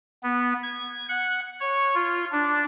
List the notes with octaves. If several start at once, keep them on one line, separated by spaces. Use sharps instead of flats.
B3
G#6
F#5
C#5
F4
D4